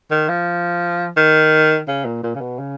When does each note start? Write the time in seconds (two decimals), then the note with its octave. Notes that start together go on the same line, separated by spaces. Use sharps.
0.11 D#3
0.29 F3
1.17 D#3
1.88 C#3
2.06 A#2
2.24 A#2
2.35 C#3
2.41 B2
2.59 C#3